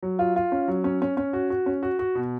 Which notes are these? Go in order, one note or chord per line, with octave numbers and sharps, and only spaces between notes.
F#3
F4
F4
C#4
F#3
C#4
C#4
C#4
F#4
F#4
C#4
F#4
F#4
B2